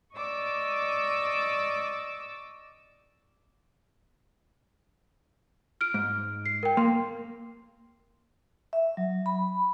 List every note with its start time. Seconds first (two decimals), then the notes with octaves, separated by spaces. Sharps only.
0.16 D5 D#5 C#6 D6 E6
5.81 F6 D7
5.94 G#2
6.46 C7
6.63 A#4 G5
6.77 A#3 C6
8.73 E5
8.97 F#3
9.26 B5